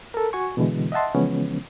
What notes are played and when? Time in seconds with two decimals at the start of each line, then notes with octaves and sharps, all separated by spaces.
0.14 A4 A#4
0.33 F#4 G#5 C#6
0.57 B2 D3 E3 G#3
0.92 D#5 E5 F#5 A5 C6
1.15 C#3 E3 F3 G#3 B3 C#4